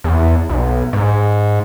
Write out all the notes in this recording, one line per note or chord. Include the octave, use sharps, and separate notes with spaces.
E2
B1
G#2